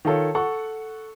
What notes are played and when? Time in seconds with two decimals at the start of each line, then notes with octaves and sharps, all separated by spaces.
0.05 D#3 F4 A4 C#5
0.35 A4 F#5 C#6